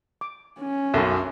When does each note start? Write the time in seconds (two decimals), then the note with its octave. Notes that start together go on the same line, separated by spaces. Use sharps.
0.21 D6
0.60 C#4
0.94 B1 F#2 A4 A#4 E5